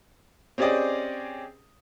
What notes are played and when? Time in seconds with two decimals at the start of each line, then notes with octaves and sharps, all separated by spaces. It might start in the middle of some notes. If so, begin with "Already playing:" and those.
0.58 C4 C#4 G4 G#4 D5 D#5